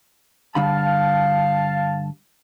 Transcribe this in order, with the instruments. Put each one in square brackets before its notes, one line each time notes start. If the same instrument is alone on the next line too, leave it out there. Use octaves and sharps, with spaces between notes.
[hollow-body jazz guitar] G2 D3 B5 [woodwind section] F5 A5